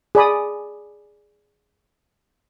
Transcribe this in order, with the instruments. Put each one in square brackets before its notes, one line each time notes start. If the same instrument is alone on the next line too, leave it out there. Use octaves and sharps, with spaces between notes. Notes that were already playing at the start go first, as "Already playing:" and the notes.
[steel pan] G#4 D5 B5 D#6